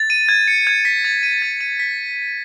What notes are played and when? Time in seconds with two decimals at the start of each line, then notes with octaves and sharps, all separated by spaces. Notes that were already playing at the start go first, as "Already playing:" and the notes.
Already playing: A6
0.10 D#7
0.29 G#6
0.48 C#7
0.67 G#6
0.85 B6
1.05 A6
1.23 D#7
1.42 A6
1.61 D#7
1.80 B6